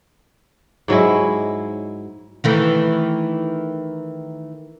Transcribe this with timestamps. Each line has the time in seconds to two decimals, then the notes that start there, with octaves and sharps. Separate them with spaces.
0.88 G#2 F#3 G#3 E4
2.44 D#3 E3 A3